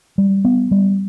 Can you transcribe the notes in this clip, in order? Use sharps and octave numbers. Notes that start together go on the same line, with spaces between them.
G3
B3
G3